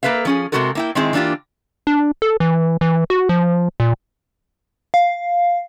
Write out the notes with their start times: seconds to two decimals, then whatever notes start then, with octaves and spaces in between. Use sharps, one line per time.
0.03 A#3 A4 B4 E5 F5
0.25 F3 C#4 G#4
0.52 C3 E3 G#3 F#4 A4 A#4
0.75 A#3 E4 G5
0.95 D#3 G#3 C4 E4 G#4
1.13 E3 A#3 D4 F4 G4
1.87 D4
2.22 A4
2.40 E3
2.81 E3
3.10 F#4
3.29 F3
3.80 A#2
4.94 F5